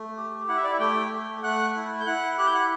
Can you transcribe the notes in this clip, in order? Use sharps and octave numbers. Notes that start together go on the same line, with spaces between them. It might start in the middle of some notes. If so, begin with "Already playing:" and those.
Already playing: A3
G4
E4 F#5
E5
D5
E4 E5
A3 G4 G5
A3
A3 F#5 F#6
E4
G6
E4 F#5 F#6
G4 F#6
G6
F#5 F#6